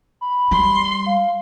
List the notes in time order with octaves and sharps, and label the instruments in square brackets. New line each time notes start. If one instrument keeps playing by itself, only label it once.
[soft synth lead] B5
[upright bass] G3 [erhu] C6
[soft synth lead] F5